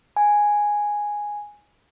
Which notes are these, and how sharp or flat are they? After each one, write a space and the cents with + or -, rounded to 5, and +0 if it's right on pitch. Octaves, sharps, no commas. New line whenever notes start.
G#5 +0